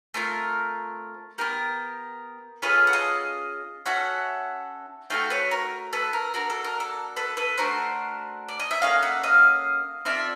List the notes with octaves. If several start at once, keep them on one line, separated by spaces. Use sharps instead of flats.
A3 C4 F4 A#4
B3 D4 G4 A#4
C#4 F4 G#4 A4 B4
F#5
D#5 F5
C#4 F#4 A4 E5 F#5
A3 D4 F#4 A4 F5 G5
B4 C#5
A#4
A4 B4
A#4
A#3 D4 F#4 A#4
A4
A#4
A4
A4 B4
A4 B4
A3 D4 F#4 A#4 C5
D5
D#5
E5
A#3 C#4 F#4 A4 D#5 F5
E5 F#5
D#5 F5
C4 F4 A4 D5 E5